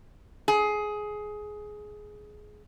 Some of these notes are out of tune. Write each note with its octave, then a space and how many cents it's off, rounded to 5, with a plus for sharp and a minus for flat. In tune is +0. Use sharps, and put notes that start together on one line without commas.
G#4 +15